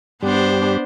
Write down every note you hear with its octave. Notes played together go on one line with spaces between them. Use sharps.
G2 G3 B3 D4 G4 C5